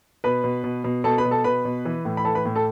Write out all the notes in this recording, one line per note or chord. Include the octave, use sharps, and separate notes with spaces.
B2 B4 B5
B2
B2
B2
B2 A4 A5
B4 B5
B2
A4 A5
B2 B4 B5
B2
E3
A2
B5
E3 A4 A5
B4 B5
A2
A4 A5